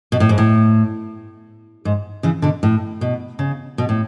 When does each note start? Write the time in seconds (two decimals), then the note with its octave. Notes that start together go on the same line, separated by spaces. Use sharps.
0.12 B2
0.20 A2
0.29 G#2
0.38 A2
1.85 G#2
2.23 C#3 E3
2.42 B2 D3
2.63 A2
3.01 B2
3.39 C#3
3.78 B2
3.89 A2